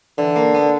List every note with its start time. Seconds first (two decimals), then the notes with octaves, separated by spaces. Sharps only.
0.18 D3 E3
0.36 A#3
0.55 B3